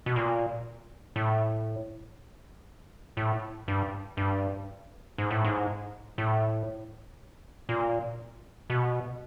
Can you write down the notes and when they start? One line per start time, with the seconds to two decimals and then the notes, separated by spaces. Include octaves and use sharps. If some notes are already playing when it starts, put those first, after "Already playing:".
0.06 B2
0.16 A#2
1.16 A2
3.17 A2
3.68 G2
4.17 G2
5.18 G#2
5.31 A2
5.45 G#2
6.18 A2
7.69 A#2
8.70 B2